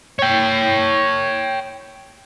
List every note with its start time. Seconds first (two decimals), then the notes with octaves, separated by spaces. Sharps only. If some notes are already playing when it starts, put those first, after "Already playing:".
0.19 C#5 G5